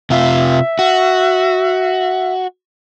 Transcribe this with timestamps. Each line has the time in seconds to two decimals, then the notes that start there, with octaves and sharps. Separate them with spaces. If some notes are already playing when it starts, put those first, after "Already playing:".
0.10 C3 F4 E5
0.79 F#4